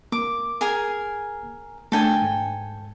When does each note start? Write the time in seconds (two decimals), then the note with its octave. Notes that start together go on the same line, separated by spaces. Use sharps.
0.12 A#3 D6
0.61 G#4 A#4 G#5
1.92 A3 D4 A4 G5 G#5
2.22 G#2